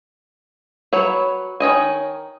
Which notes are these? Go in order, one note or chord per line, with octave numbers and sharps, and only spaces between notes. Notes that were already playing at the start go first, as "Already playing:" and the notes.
F#3 B4 C#5
D#3 C#5 D#5 G#5